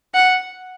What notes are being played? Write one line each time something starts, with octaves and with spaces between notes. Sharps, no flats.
F#5